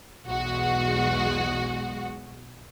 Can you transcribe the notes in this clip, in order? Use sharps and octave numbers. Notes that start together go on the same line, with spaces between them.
B1 E2 G#3 F#4 F#5